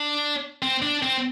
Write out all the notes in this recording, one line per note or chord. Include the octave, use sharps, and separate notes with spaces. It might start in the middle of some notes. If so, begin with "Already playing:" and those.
Already playing: D4
C4
D4
C4